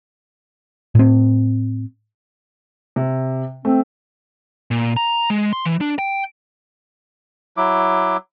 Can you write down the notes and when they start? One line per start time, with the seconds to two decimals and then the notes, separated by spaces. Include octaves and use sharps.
0.95 A2 C4
2.96 C3
3.65 A3 C4
4.71 A#2
4.96 A#5
5.30 G#3
5.53 C6
5.65 E3
5.81 D4
5.99 G5
7.57 F#3 E4 D6